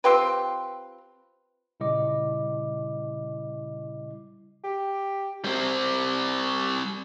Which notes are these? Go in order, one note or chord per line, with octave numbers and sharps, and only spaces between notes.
C4 F4 G4 B4
A#2 C#3 G3 E4 D#5 D6
G4
G3 C4